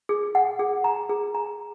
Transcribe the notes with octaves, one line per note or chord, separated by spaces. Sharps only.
G#4
F#5
G#4
A#5
G#4
A#5